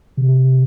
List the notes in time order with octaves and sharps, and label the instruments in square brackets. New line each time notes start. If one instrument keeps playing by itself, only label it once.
[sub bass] C3